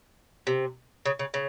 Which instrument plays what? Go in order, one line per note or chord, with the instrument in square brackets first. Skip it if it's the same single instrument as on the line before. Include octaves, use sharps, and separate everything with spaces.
[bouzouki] C3
C#3
C#3
C#3